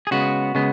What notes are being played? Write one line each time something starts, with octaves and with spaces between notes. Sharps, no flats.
G#4
C#3 G#3 B3 F#4
C#3 G#3 B3